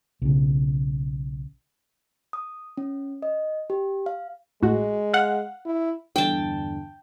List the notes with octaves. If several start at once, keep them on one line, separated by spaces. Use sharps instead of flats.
B1 C#3
D#6
C#4
D#5
G4
F5
A1 A2 G#3 F#4
F5 F#5
E4
E2 G2 D3 G5 A5